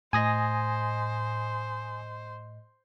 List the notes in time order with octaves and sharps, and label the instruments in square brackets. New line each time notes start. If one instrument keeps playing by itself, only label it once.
[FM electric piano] A2 D#5 [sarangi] C5 [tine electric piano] G#5 D#6 A#6